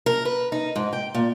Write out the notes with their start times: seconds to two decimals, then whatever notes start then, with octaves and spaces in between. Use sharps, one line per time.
0.06 A#4
0.25 B4
0.52 D#4
0.76 G#2
0.93 G5
1.14 A#2